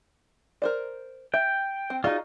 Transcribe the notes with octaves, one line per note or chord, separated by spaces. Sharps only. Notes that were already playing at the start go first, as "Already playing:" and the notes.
A#4 C5 D5
E5 G5
C4
D#4 F4 F#4 G#4 D5